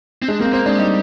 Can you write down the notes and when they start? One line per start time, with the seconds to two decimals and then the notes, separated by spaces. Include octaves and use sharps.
0.22 C4
0.28 G#3 D4
0.40 A#3 C4
0.53 A#3 C4
0.66 G#3 D4
0.78 G3 D#4